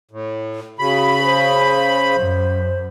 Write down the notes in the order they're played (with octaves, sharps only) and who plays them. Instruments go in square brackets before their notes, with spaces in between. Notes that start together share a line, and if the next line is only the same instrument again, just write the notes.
[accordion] A2
[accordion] C#3 B5 [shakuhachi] F#4
[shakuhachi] C5
[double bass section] F#2